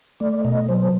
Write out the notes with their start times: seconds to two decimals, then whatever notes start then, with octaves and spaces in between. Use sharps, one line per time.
0.20 A3 D5
0.45 B2 D#5
0.68 F#3 C5